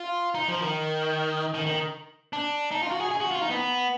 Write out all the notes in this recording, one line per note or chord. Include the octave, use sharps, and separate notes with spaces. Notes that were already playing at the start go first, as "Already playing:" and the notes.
Already playing: F4
D#4
F3
D#3
D#3
D#3
D4
D#4
F4
F#4
G#4
G#4
F#4
F4
D#4
B3